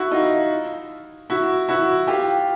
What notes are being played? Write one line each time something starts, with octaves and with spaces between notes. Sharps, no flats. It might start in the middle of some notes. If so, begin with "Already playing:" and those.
Already playing: E4 F#4
D#4 F4
E4 F#4
E4 F#4
F4 G4